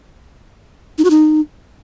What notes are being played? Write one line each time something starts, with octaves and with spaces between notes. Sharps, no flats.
D#4
F#4
D#4